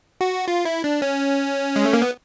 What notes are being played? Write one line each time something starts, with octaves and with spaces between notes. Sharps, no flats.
F#4
F4
E4
D4
C#4
G#3
A3
A#3
B3